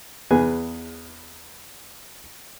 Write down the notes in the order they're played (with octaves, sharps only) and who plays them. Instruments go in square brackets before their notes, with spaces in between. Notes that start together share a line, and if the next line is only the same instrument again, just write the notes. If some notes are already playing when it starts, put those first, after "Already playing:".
[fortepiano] E2 G#4 B4 G#5